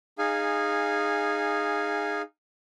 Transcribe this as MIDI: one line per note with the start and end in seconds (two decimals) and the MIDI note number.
0.18 2.22 63
0.18 2.22 68
0.18 2.22 77
0.18 2.22 80